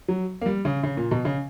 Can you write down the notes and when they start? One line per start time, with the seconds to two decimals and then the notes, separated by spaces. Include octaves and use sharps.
0.08 F#3
0.41 A#3
0.46 G3
0.65 C#3
0.83 C#3
0.97 A#2
1.11 B2
1.25 C#3